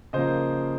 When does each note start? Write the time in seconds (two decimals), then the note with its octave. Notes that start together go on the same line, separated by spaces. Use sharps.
0.13 C#3 F3 A#3 C5 D#5